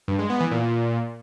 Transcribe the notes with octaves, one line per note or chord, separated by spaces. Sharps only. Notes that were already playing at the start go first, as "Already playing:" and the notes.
G2
G#3
B3
E3
A#2